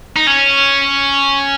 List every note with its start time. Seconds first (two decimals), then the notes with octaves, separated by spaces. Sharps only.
0.16 D#4
0.27 C#4